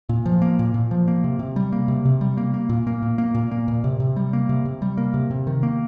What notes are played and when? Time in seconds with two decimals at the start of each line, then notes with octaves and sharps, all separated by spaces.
0.09 A#2
0.26 F3
0.42 A#3
0.59 A#2
0.74 A#2
0.91 F3
1.08 A#3
1.24 C3
1.39 C3
1.56 G3
1.73 A#3
1.88 C3
2.05 C3
2.21 G3
2.37 A#3
2.54 A#3
2.69 A#2
2.87 A#3
3.02 A#2
3.18 A#3
3.35 A#2
3.51 A#3
3.68 A#2
3.84 C3
4.00 C3
4.16 G3
4.33 A#3
4.49 C3
4.65 C3
4.82 G3
4.97 A#3
5.14 C3
5.31 C3
5.47 D#3
5.63 A#3